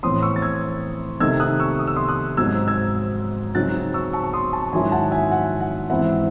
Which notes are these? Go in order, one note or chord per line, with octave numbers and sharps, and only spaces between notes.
A2 E3 C4 C6 D#6
C#6 E6
A6
E6 G#6
C3 D#3 A3 D#4 E6 G#6
D#6 F#6
C#6 E6
D#6
E6
C6 D#6
D#6 F#6
G#2 F#3 C4 D#4 E6 G#6
E6 G#6
C#3 F#3 C4 D#4 F#6 A6
C#6 E6
A5 C#6
C#6
C6 D#6
A5 C#6
G#2 D#3 F#3 C#4 E4 G#5 C6
F#5 A5
E5 G#5
F#5
F#5
G#2 E3 C4 E4 F#5